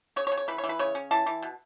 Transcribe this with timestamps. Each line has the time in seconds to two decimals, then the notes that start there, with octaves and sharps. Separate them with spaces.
0.16 C#3 C#5
0.27 C#5
0.32 C#3
0.37 C#5
0.48 E3 B4
0.58 C#5
0.64 E3
0.69 B4
0.79 C#3 C#5
0.95 C#4
1.11 E3 A5
1.26 E3
1.42 B2